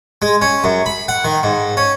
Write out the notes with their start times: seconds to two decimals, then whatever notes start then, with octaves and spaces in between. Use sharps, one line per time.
0.22 G#3
0.42 C#4
0.64 F#2
0.86 B5
1.08 F#5
1.25 D#3
1.43 G#2
1.77 C#4